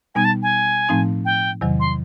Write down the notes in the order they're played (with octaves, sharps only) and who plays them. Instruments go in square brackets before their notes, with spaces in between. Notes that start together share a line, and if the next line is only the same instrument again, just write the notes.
[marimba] B2 G3 B3 D#4 [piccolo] G#5
[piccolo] A5
G#5
[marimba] A2 F3 A3 C4 D#4
[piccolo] G5
[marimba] E2 C3 D#3 F#3
[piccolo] C6